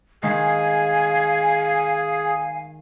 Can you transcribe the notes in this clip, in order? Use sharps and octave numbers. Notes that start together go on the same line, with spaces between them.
D#3 G#3 G#4 F5 G#5